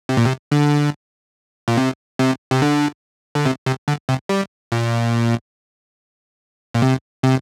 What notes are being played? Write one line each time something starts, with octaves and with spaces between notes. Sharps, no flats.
C3
A#2
C3
D3
A#2
C3
C3
C3
D3
D3
C3
C3
D3
C3
G3
A#2
A#2
C3
C3